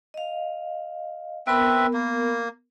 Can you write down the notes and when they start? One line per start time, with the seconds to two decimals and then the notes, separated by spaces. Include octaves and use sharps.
0.14 D#5 F5
1.47 B3 C4 A#4 B4 E5 B5
1.93 A#3